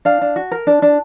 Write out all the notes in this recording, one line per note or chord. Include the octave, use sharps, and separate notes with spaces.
D4 F5
D4
F#4
A#4
D4
D4